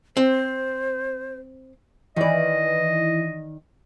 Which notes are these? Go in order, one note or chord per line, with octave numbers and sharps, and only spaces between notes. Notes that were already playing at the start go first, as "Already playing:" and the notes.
C4 C5
D#3 E3 D5 D#5